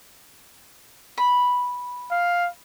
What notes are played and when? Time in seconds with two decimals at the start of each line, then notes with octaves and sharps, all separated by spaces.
1.18 B5
2.11 F5